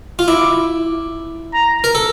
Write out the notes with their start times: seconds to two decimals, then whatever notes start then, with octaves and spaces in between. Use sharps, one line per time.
0.19 F4
0.28 E4 D6
1.54 A#5
1.84 A#4
1.95 A4